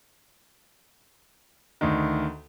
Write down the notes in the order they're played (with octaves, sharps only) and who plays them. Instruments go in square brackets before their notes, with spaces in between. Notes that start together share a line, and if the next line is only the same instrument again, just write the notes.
[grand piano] D2 D#3